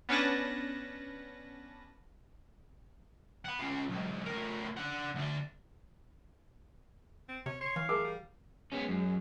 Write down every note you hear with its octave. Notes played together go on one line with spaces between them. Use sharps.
B3 C#4 D4 B4 A5 A#6
F#5 B5
C#4 F4
B1 G#2
A2 A#4
D4 F#5
D2 D4
C4
C3 C#5
C#5 C6
E3 F5
A3 G#4 A#4 D6
G3
G#3 B3 C#4
F#2